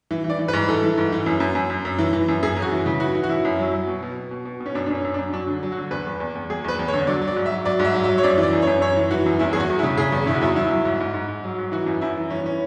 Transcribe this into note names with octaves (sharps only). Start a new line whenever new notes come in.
E3
E3
D5
E3
B4
G#2
E3 A4
E3
G#2
E3
F#2
F#2
F#2
F#2
F#2
E3
E3
F#2
F#2 G#4
F#2
F#4
E3
C#3
E3 F#4
E3
F#4
F#2 E4
F#2
F#3
F#3
B2
B2
B2
B2
B2
B2
C#4
F#2 D4
D4
F#2 C#4
F#2
D4
F#2
F#3 D4
D3
F#3
F#4
D3
E2 B4
E2
E2
E2
E2 G#4
E2 B4
E2
C#5
D3
F#3 D5
F#3
D5
G#2
E5
F#3
F#3 D5
G#2
E5
F#3
E5
F#3
C#5
F#2 D5
E3
D5
F#2
C#5
F#2
F#2 C#5
E3
E3 F#4
F#2
E2 E4
E2 G#4
F#4
E2
E4
C#3
C#3 G#4
E2
C#3 E4
F#4
E2 E4
F#3 E4
F#3
G#2
G#2
G#2
G#2
F#3
G#2
E3 F#4
F#2
F#2 E4
E3
E3 C#4
B3
C#4